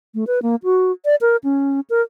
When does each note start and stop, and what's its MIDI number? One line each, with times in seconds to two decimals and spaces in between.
0.15 0.24 57
0.27 0.39 71
0.42 0.56 58
0.64 0.92 66
1.05 1.15 74
1.21 1.37 70
1.44 1.80 61
1.90 2.02 70